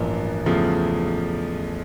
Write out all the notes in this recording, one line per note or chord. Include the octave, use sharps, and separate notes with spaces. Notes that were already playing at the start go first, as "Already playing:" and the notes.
Already playing: A1 G2 F3 A#3
E2 C#3 F3 A3